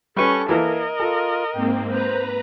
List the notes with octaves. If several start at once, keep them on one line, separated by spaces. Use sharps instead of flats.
G3 C#4 A4 B4 C#6
E3 A#3 E4 A#4 D#5
F4 A4
G#2 A#3 C4 G5
B4 C5 A#5